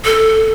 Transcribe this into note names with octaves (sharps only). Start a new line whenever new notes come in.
A4